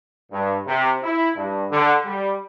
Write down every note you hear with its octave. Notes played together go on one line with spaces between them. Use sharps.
G2
C3
E4
G2
D3
G3